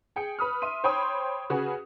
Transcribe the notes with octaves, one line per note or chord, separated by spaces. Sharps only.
G#4 G5 C#7
B4 B5 D#6 F6
E5 C6 D#7
C5 C#5 G5 B5 C6 D#6
C#3 F#4 G#4 B4